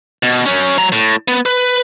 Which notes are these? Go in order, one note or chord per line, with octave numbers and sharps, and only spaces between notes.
B2
F#3 C#4
F#3 A#5
A2
B3
B4